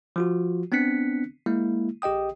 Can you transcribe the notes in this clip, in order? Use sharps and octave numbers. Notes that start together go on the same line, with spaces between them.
F3 F4 F#4
B3 C4 D4 F#6 B6 C#7
G#3 A#3 E4
A#1 G4 D#5 G5 D#6